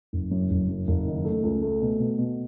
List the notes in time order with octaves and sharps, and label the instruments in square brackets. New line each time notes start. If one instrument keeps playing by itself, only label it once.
[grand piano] F#1
F#2
F#1
F#2
F#1
D#3
A3
C#2
A3
B2
B2
B2